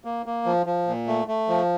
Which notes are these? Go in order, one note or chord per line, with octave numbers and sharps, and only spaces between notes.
A#3
A#3
F3
F3
A#2
A3
A3
F3